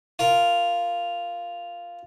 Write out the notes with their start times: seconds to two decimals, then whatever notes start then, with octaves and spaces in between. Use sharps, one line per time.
0.19 F4 A#4